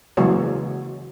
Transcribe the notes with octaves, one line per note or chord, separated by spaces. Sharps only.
C#3 E3 F#3 G#3 A#3 C#5